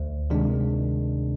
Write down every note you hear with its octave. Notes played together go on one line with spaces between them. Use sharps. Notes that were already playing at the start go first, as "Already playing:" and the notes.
Already playing: D2
C3 D#3 G#3 D4